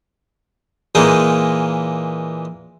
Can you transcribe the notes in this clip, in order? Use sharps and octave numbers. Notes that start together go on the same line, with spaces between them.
A#2 E3 G#3 A#3 D#4 G#4